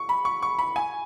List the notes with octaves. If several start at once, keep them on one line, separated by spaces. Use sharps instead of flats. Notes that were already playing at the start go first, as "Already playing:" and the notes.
Already playing: C#6
B5
C#6
C#6
B5
G#5